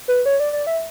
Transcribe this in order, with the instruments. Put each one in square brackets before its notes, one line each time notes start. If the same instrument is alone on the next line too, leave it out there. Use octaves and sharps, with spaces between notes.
[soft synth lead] B4
C#5
D5
D5
E5